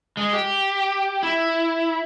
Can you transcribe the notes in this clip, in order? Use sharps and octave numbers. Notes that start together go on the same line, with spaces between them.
G#3
G4
E4